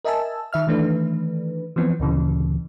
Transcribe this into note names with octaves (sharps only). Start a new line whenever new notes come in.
A#4 D#5 E5 G#5 A5 E6
D#3 E5 F6
D#3 E3 A3 D4 B4
E3 F3 B3 C4
D2 A#2 C#3 E3